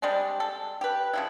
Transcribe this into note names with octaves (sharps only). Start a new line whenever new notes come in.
G3 G#3 C4 D4
A4
G4 B4
C#3 F3 E4